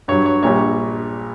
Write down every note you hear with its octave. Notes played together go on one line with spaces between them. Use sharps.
G2 F#3 C#5
C#5
A#1 A#2 G3 C#5